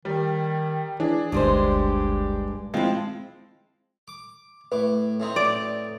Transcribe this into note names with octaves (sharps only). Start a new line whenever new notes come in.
D#3 G3
E3 D4 G#4
G1 D2 G2 G#3 G4 C5
F3 G#3 C4 E4 F5
D6
A2 B4 D6
A2 C4 D#4
D5